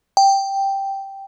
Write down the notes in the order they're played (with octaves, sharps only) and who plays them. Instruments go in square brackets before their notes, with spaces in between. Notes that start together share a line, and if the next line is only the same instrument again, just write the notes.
[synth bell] G5